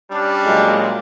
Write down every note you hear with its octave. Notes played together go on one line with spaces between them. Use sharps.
G3 C#4 D4
A#2 F#3 G#3